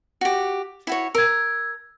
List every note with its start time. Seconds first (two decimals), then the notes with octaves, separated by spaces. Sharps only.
0.21 F#4 G4
0.87 E4 F#4 C#5
1.15 A#4 E6 G#6